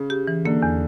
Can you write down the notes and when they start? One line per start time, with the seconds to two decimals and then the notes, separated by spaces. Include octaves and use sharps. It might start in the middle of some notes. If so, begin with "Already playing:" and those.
Already playing: C#3
0.10 G4
0.27 E3
0.45 D3 A#3
0.62 E2